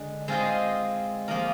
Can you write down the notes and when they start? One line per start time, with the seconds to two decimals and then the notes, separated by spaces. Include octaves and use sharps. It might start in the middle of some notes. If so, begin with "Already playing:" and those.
Already playing: D3 G#3 D4
0.28 G#3 C4 F4 C5 D#5
1.28 F3 A#3 F4 A#4 D#5